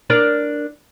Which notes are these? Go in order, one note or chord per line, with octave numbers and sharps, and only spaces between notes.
D4 A#4 D5